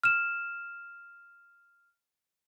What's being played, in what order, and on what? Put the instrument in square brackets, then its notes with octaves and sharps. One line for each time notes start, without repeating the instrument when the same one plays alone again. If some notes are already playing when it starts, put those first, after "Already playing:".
[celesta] F6 E7